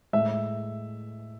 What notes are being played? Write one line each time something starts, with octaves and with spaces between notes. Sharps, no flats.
A2 G#3 E5